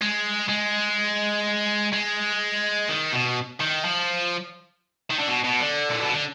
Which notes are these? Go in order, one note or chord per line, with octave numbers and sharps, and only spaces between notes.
G#3
G#3
G#3
D#3
B2
D#3
F3
D#3
D3
B2
B2
D3
A#2
B2
D3